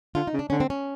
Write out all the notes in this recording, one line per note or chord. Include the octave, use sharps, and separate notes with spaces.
D3 F4
D#4
C#3
D4
D3 C#4
C4
C#4